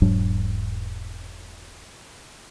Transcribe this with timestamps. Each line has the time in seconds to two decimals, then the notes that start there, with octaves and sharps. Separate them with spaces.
0.02 E1 G#2 F#3 D4